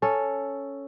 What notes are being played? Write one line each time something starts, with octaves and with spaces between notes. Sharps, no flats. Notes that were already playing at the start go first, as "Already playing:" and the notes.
C#4 A4